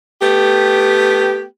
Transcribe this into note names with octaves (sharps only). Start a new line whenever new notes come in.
A3 B3 G4